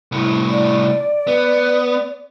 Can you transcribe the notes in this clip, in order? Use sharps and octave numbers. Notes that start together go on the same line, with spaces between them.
C2 A2
D5
B3